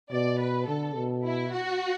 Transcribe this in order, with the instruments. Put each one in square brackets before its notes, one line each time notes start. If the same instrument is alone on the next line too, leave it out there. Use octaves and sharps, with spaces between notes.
[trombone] B2 [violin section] D5
[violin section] B4
[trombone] D3 [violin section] A4
[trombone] B2
[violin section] E4
F#4